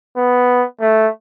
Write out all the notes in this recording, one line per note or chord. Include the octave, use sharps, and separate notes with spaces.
B3
A3